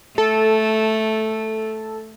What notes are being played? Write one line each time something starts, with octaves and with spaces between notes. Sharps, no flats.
A3 A4